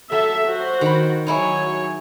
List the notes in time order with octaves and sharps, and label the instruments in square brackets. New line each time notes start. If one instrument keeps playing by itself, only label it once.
[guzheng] F#3 [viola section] A4 E5
[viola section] F#4 C5
[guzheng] D#3 B5
[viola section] F#3 C#5 [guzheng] D#4 E4 G#4